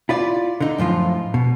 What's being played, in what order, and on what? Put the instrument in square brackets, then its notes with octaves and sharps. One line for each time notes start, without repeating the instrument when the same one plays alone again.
[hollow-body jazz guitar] E4 F4 D5
D3 D#4
F#2 A2 F3 F4
B2